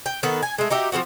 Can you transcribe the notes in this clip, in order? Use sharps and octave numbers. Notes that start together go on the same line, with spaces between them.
G5
D#3 B3 A4 B4
G#5
G#3 A3
D#4 F#4 G4 E5
F3 G#3 C4 F#4